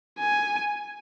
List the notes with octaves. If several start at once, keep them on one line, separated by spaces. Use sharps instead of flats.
G#5